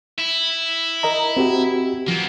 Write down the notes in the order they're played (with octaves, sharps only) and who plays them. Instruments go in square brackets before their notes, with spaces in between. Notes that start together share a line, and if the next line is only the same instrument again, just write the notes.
[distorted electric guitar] E4
[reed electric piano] A#4 D#5 A#5
C4 F#4 G4
[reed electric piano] F3 [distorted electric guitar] A#3 B3